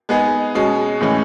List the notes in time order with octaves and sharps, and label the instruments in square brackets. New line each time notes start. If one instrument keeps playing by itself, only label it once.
[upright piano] G#3 B3 D#4 G#4
B2 G#3 C#4
A2 E3 G#3 C#4